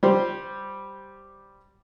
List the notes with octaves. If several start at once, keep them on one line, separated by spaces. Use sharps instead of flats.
G3 G4 C5